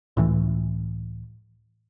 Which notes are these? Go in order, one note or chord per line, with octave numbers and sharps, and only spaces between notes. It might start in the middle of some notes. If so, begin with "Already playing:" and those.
C#2 A2 E3